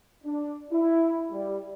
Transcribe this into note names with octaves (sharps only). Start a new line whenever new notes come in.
D4
E4
G3